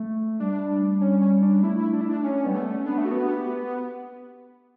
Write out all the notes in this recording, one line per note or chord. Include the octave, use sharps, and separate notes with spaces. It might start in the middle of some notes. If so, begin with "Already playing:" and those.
Already playing: A3
G3 D4
C#4
C#4
D4
A3 E4
E4
D4
E4
D4
C#4
G3 B3
A3
C#4
B3 D4
A3
F#4
B3
G4